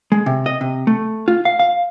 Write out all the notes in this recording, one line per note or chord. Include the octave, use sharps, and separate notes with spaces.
G#3
C3
D#5
C3
A3
F4
F5
F5